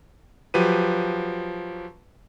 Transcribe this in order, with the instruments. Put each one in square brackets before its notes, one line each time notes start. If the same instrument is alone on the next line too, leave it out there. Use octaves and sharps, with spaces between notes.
[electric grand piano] F3 F#3 G4 B4 D#7